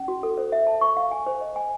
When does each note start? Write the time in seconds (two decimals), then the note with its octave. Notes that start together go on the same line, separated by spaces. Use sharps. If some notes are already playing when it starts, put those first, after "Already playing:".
Already playing: C#4
0.08 F#4
0.23 A4
0.38 C5
0.52 E5
0.67 A5
0.81 C#6
0.97 F5
1.11 G#5
1.26 C5
1.41 D#5
1.56 G#5